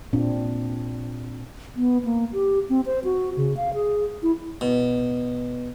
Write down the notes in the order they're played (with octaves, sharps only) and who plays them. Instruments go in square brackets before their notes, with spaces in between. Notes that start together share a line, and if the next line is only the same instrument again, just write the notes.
[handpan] A#2 C4 D4
[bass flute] B3
A#3
G4
C4
C5
F#4
C#3
F5
G#4
E4
[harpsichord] B2